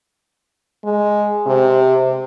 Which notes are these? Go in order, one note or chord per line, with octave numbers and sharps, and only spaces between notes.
G#3
C3